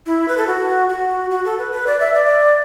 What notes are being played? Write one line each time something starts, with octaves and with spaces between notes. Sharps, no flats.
E4
B4
A4
F#4
F#4
F#4
A4
B4
B4
D5
E5
D5